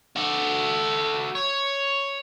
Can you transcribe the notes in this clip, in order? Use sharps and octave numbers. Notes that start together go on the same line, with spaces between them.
F#4 A4
C#5